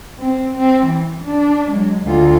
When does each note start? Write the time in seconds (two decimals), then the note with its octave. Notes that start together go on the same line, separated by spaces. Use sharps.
0.19 C4
0.57 C4
0.86 E3
1.24 D4
1.71 F#3 G#3
2.03 D2 F4